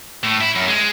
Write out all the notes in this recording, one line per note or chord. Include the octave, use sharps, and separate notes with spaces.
A2
E4
F#2
G#3